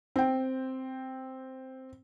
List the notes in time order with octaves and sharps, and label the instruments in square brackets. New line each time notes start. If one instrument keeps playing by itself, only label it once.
[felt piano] C4 G5